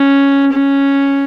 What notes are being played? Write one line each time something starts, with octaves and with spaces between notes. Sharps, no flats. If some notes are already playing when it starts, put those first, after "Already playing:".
Already playing: C#4
C#4